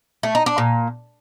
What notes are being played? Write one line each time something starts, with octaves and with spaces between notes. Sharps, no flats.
A3
D#4
D4
A#2